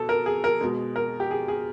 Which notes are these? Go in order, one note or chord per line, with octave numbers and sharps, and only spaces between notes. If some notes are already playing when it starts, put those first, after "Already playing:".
Already playing: B2 A4
A#4
G#4
A#4
B2 G#3
A#4
G4
G#4
G#4